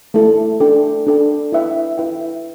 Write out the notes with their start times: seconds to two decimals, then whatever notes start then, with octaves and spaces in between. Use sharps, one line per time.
0.14 A3 E4 A4
0.60 D4 A4 G5
1.07 D4 A4 G5
1.52 E4 B4 E5 G5
1.98 E4 B4 E5 G5